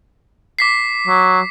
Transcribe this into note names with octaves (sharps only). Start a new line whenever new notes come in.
D6 B6 C7
F#3